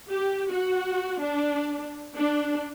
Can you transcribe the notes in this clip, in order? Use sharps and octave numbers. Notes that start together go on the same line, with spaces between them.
G4
F#4
D4
D4